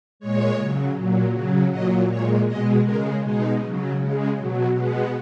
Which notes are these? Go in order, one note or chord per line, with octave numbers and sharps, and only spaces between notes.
A#2 G#3 C#5
C#3 F#3
A#2 F#3
C#3 F#3
A#2 F#3 D#5
A#2 G#3 C#5
B2 G#3 D#5
C#3 G#3 A#4
B2 G#3 D#4
C#3 F#3
C#3 G#3
B2 F#3
B2 G#3 B3